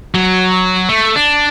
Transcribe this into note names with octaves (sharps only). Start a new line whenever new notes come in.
F#3
A3
D4